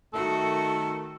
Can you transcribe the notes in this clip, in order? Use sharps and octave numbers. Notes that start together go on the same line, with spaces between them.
D#3 A3 F#4 A4